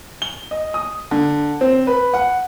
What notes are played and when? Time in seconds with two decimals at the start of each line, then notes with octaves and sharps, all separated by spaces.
0.22 G7
0.51 D#5
0.74 D#6
1.11 D3
1.61 C4
1.87 B4
2.14 F#5